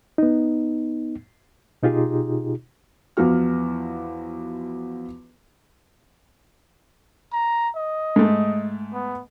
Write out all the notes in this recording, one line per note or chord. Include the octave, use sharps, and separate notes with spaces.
B3 D#4
B2 D#4 F4 G4 G#4
E2 F3 B3 F#4 F6
A#5
D#5
G#2 A3
B3